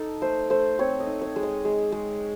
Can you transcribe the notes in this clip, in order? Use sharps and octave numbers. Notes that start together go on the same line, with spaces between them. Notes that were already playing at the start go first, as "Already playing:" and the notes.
Already playing: D#4 A4
A3 C5
A3 C5
C4 C#5
D#5
D#4
C#5
G#3
D#5
G#3
G#3